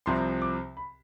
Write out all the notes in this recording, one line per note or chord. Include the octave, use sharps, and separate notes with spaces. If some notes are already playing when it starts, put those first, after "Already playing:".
C2 C3 F3 C4 C6
D6
B5